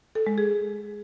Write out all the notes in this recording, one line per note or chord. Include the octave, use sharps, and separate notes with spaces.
A4
G#3
G#4